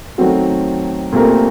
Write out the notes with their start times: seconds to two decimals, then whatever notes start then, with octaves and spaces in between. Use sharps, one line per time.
0.18 D#3 F#3 A3 C4 F#4
1.12 A#2 A3 C4 G4 A#4